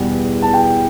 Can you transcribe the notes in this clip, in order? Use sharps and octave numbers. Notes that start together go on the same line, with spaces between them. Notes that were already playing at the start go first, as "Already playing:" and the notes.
Already playing: E2 B2 G3 B3
A5
G5